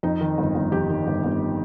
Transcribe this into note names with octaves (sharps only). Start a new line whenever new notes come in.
F2 D#4
D#3
G1
G1
F2 G4
D#3
G1
G1